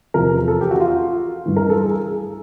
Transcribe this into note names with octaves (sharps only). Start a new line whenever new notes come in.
E2 C3 F3 A#4
A4
G4
F#4
F4
G2 E3
A#4
A4
G#4